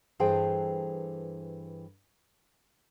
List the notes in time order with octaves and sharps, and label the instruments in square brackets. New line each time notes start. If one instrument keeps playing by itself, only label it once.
[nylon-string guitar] G2 E3 G#4 A4 C5 G5